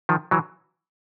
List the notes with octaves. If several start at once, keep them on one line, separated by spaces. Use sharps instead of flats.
D#3 F3
E3 F#3